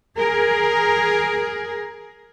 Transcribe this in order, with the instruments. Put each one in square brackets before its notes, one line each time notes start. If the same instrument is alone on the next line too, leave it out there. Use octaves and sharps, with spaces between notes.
[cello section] G#4 A#4